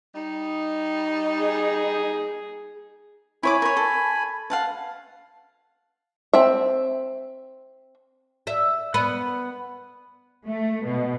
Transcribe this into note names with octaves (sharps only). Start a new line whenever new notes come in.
G3 D#4
G#4
E4 C#5 G#5 B5 D6
A#4 C#5
A4
F5 F#5 A5
C4 E5
E5
B3
A3
B2